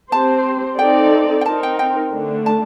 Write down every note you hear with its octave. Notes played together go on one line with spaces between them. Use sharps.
C4 G4 C5 A5
C4 D#4 A4 D5 G5
G5
C4 D#4 A#4 A5
G5
G5
D3 A3 D4
A5